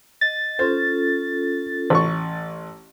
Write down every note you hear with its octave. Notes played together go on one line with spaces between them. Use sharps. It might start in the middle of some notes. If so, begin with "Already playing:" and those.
D#5 A6
C#4 F4 A4 C5
A1 C#6